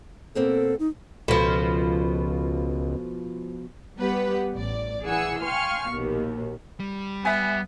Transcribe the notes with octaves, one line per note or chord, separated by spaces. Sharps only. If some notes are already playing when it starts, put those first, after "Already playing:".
B2 A#3 C4 A4
D#4
C#2 B2 F3 A4 B5
G3 B3 G4 B4 F#5
A1 D5
E3 G#4 F#5 G#5 E6 C#7
F5 G5 G#5 C6 C#6 F6
A#1 D#2 B2 B3
G3
B3 E5 G#5